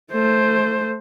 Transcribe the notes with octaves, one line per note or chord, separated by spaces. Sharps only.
A3 C5